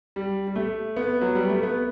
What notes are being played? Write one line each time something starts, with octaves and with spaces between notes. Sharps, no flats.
G3
G3
A3
B3
F#3
G3
A3
B3